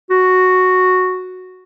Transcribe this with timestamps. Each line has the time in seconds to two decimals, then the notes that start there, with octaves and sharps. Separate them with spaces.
0.10 F#4